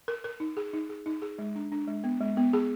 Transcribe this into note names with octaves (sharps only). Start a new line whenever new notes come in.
A#4
A#4
D#4
G#4
D#4
G#4
D#4
G#4
G#3
D4
D4
G#3
B3
G#3
B3
G#4